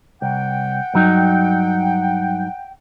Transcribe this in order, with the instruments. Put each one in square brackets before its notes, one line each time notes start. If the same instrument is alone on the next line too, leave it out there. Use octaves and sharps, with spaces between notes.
[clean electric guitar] C2 [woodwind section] F#5 G5
[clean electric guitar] G2 F#3 D#4